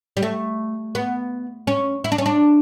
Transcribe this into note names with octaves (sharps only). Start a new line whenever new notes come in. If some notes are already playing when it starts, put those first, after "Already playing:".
G3
A3
B3
C#4
E4
D4
C#4
D4